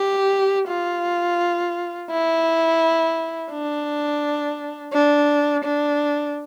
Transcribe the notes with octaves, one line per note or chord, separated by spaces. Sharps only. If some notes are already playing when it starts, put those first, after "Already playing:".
Already playing: G4
F4
E4
D4
D4
D4